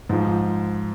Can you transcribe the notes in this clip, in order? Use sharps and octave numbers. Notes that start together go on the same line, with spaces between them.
G#2 F3